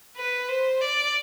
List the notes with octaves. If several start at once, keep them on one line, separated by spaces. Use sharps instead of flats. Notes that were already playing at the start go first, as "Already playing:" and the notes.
B4
C5
D5